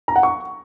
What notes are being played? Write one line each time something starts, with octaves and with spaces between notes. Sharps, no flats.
A#5
F#5
C#6